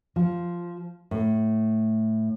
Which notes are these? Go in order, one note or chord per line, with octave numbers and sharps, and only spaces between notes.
F3
A2